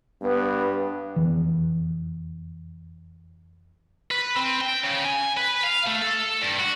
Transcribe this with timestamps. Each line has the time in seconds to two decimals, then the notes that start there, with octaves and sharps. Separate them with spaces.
0.22 G2 B3
1.16 F1 E2 E3
4.11 B4
4.37 C4
4.61 G5
4.83 C#3
5.05 G#5
5.37 B4
5.64 F5
5.86 A3
6.01 A4
6.42 G2
6.59 F#4